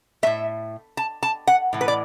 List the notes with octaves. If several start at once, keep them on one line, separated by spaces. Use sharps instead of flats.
A2 A3 E5
A5
A5
F#5
A2 E3
B4
D5